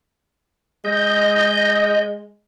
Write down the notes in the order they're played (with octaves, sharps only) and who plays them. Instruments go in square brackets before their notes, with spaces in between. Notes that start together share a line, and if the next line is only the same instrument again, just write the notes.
[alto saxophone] G#3 [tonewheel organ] D#5 G6